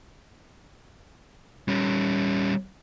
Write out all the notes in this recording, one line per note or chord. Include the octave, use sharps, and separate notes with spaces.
G3 C#4